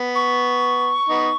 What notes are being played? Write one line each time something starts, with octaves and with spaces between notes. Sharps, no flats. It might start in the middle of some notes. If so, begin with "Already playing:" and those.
Already playing: B3
C#6
B3 D#4